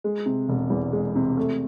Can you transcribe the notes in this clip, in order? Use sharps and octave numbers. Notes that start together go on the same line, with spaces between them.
G#3
C3
E1
E2
G#3
C3
A3